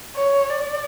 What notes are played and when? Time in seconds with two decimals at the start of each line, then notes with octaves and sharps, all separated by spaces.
0.16 C#5
0.49 D5